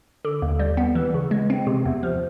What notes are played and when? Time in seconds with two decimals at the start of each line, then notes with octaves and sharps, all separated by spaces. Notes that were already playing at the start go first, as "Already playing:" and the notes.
0.25 D3
0.42 D#2
0.59 G3
0.77 B3
0.95 E3
1.14 C#3
1.31 G#3
1.50 C4
1.67 C3
1.85 E2
2.03 F3